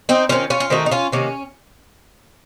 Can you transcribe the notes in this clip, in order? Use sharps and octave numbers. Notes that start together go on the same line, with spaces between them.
C4 D#4
D#3 A3 C4 C#4 F4
C#4 F4
F4
D#3 A3 C4 D#4 F#4
D#4
C#4 F4
C3 D#3 A#3 C#4